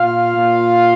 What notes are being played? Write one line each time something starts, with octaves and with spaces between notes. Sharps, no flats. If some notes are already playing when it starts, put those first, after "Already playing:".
Already playing: A#2 F4 F5
A#2